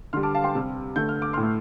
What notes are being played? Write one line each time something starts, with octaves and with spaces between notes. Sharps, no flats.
D3 G3 C6 F6
A5 D6
F5 A5
G5 C6
C3 G3
D3 A3 G6
F6
D6
A2 C6 F6
A3